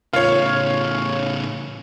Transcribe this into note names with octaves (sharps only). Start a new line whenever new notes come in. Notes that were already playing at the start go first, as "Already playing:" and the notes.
A2 C#3 F4 C#5